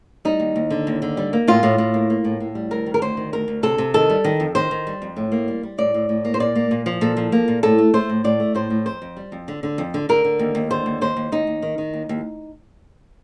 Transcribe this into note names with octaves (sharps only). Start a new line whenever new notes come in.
G3 D#4
D#2
D#2
D3
D#2
D3
G3
A#3
A2 F4
A2
A2
A#3
A#3
A2
A2
G3
D2 A#4
D#3
A#4
D2 C5
D#3
D2 A#4
D2
C3 A4
C3
D#3 A4
G3
D#3
F2
D#3 C5
D#3
G3
F2
A2
A#3
G3
G3
A2 D5
A2
A2
A#3
C5
A#2 D5
A#3
A#2
F3
A#2 A4
F3
A#3
A#2
A2 A4
A3
A3 C5
A2
A2 D5
A3
A2 C5
A2
F2 C5
F2
G3
F2
D3
D3
F2
D3
D3 A#4
D3
D#2
D#2
D3 C5
D#2
D#2 C5
D#2
D#2 D#4
D#2
D#3
D#3
D#2
D#2